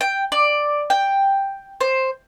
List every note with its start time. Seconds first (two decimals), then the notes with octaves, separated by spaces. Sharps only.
0.01 G5
0.32 D5
0.90 G5
1.81 C5